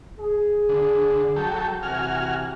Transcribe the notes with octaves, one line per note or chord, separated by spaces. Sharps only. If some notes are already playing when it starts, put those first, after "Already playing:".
G#4
D3
F#3 A4 G5
C3 E3 F#4 G#5 F6